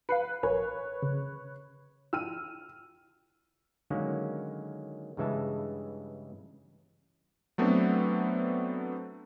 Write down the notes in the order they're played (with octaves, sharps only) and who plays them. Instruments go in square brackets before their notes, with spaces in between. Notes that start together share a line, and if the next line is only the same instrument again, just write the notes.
[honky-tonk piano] B4 [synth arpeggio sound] F5 C7 C#7
[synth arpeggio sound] A#1 A#4 G#5 [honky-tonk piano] B4 C#5
[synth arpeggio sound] C#3
[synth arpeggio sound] E4 F4 G5 [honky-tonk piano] E6 F6 D#7
[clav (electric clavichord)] D3 D#3 F#3 G#3 A#3 C#4
G2 C#3 E3 G#3 E5 A5
[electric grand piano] F#3 A3 B3 C4 D4